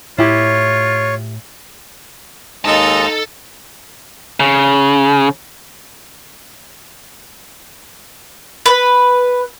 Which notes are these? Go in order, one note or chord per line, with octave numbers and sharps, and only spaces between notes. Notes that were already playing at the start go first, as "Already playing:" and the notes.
A2 E4 F4 G4 C#5
D#2 G#3 D#4 A4 D#5 A5
C#3
B4